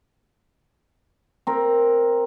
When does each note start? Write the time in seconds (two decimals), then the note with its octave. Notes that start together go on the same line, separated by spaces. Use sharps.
1.47 C4 A#4